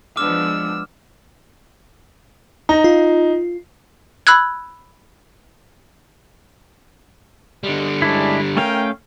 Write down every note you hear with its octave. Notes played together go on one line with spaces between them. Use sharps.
F3 G#3 B3 D4 D6 E6 F6
D#4 A#5
F4
B5 E6 F#6 G#6
D3 G3 G#3
G#3 C#4 E4 D5 A5
A3 C#4 A#4 F5 G5